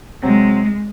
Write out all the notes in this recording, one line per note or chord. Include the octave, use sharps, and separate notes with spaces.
C3 F#3 G#3 C4